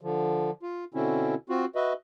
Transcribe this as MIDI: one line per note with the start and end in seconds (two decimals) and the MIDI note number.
0.01 0.51 50
0.01 0.51 53
0.63 0.85 65
0.94 1.35 47
0.94 1.35 50
0.94 1.35 60
0.94 1.35 61
0.94 1.35 64
1.49 1.65 60
1.49 1.65 65
1.49 1.65 66
1.75 1.93 66
1.75 1.93 71
1.75 1.93 75
1.75 1.93 76